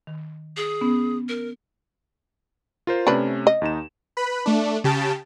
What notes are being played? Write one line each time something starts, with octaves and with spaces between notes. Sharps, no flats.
D#3
G#4
B3 C#4
A#4
F4 A#4 C5
C3 A3 C#4 D4 B4
D#5
D#2 D#4 E7
B4 B5
A3 D4
C#3 G4 A5